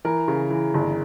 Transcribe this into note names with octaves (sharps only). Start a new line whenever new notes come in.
E3 A#4
C#3
E3
G1